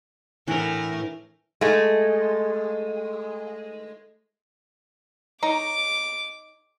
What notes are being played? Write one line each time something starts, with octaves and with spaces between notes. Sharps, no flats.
A2 E3 A3 D4 A#4 F#5
G#3 A3
D#4 C#5 A#5 D6